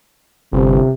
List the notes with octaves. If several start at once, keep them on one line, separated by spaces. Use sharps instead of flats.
G1 C3